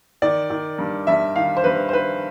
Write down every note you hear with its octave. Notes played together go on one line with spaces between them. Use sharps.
D#3 D5
D#3
G2
G2 E5
D#3 F5
C5
G2 B4
C5
D#3 B4